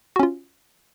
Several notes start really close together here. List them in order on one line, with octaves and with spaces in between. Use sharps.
F#4 C#4 F4